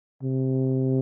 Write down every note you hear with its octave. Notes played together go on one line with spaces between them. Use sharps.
C3